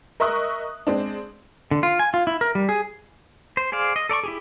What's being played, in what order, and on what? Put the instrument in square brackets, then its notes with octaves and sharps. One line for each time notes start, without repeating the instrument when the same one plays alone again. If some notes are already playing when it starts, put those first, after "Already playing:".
[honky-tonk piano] A#4 D#5 E5 C#6 D#6 F#6
G#3 C4 D4
[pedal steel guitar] D3
F4
G#5
F4
E4
A#4
G3
G#4
C5
G#4 C5 D5 F5
D#5
A4 D5 A#5 C#6
E4 G4 G#4